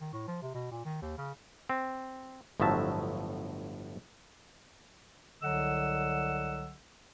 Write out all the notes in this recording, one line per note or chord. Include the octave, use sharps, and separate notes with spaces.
D#3
A2
F3
C3
B2
A#2
D#3
D#2
C#3
C4
G1 A2 F3 F#3 E5 A5
C2 D3 F#3 D#5 F#5 E6